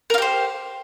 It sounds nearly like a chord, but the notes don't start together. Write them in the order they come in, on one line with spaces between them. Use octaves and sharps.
A#4 F4 G4 C5